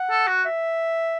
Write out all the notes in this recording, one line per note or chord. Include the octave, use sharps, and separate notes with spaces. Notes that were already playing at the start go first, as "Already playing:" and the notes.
Already playing: F#5
A4
F#4
E5